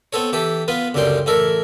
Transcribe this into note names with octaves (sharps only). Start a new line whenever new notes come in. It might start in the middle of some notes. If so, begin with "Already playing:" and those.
B3 C4 A4 C#5
E3 G4 A4
B3 F4 B4
C#2 F#2 D3 G3 G5 C6
A1 E4 A4 A#4